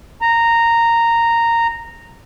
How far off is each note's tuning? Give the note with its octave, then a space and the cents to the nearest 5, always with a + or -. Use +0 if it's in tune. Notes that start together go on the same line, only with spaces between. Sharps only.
A#5 -10